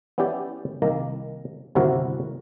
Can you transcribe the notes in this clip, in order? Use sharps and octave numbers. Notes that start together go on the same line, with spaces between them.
B3 C#4 E4 G4 D5 G5
C2 D#3 A#3 A#5
G1 D#2 C3 E4 F#4 A#4